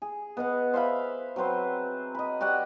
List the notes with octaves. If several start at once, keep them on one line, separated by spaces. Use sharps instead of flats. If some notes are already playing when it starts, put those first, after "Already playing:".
G#4
B3 D#5 F#5
C5 E5 F5 B5
F#3 C4 B4 C5
D#5 B5
F#4 G4 D5 F#5